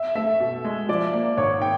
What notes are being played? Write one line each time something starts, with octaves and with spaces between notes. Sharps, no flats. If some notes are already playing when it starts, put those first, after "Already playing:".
Already playing: E5
A3 E5
B2
G#3
F3 D5
A#3
G#1 C#5
G5